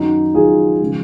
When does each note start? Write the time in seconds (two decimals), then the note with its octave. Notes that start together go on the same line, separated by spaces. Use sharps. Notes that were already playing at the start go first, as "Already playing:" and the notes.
Already playing: F#2 D#3 F#3 D#4 F#4
0.34 F#2 D#3 F#3 F4 G#4
0.80 C#3 F3 G#3